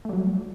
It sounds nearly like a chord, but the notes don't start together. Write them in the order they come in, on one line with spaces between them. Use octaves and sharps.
A3 G3 F#3